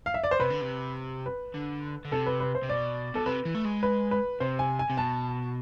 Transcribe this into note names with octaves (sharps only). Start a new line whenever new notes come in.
F5
E5
D5
C5
C3 B4
D3
C3
B4
D3
D3
C3 A4
B4
B4
C5
C3
B2 D5
B2 A4
C3 B4
E3
A3
G#3
B4
B4
C3 C5
G#5
G#5
C3
B2 A5